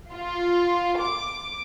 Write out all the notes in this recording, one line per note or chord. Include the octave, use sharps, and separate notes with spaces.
F4
D6